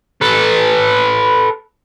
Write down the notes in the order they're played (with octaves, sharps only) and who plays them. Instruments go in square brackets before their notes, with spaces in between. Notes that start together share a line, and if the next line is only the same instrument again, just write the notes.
[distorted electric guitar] A4 B4